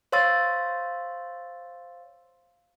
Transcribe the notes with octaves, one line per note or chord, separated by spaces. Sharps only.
C5 C#5 F5 C6 E6 A6